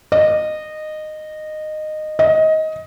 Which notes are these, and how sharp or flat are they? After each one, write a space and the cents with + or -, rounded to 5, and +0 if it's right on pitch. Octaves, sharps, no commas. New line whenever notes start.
D#5 -15
D#5 +20